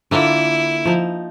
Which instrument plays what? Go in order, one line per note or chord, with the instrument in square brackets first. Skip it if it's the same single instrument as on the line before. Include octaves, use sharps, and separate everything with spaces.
[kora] D3 A#3 F4 [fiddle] E4
[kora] F3 D#4